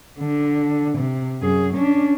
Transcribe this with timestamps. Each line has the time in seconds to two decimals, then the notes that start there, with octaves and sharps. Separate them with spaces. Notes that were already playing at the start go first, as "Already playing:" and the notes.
0.20 D3
0.98 C3
1.41 F#2 G#4
1.73 C#4 D4